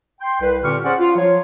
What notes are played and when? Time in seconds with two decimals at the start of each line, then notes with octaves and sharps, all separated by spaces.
0.21 G5 C6
0.41 C2 B4
0.63 A#2 D3 C4 G4 C#6 F6
0.84 C#4 G#4 C5 D5 F#5
0.99 F4
1.16 F3 F#3 F4 C#5